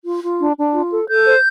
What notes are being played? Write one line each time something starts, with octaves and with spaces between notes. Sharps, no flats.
F4
F4
D4
D4
F4
A4
A4 G6
C5